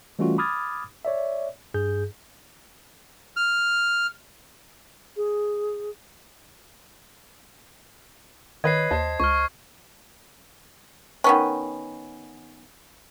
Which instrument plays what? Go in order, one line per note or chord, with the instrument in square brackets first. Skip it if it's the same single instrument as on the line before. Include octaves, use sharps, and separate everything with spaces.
[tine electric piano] E3 G3 A3 C#4 F4 F#4
B5 D6 D#6 F6 G#6 A6
C#5 D5 E5
G2 G#4 G6
[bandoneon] F6
[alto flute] G#4
[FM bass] D#3 [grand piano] B4 C#5 D#5 [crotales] G#6 C7
[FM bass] D#2 [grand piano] C5 D#5 A5
[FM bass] C#2 [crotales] C#6 F6
[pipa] D#3 B3 C#4